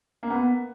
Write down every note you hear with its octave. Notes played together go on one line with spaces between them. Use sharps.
A#3
B3